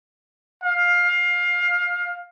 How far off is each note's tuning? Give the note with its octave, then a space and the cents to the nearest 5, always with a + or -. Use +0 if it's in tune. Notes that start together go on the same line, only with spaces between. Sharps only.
F5 +20